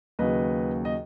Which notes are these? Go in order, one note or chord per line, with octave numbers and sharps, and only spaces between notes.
D#2 C#3 F#3 B4 D#5
D#5